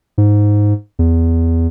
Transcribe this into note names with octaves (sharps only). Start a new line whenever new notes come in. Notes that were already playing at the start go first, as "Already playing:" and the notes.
G#2
E2